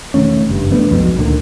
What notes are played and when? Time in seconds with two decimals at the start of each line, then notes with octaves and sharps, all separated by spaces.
0.14 E1 D#3 A3 C#4
0.49 F#1 G2
0.70 E3 A3 B3 D4
0.91 B1 F2 G#2 B2
1.19 D2 A#2 D3 D#3